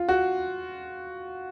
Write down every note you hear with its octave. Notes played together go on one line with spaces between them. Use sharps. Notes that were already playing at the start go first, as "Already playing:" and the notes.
Already playing: F4
F#4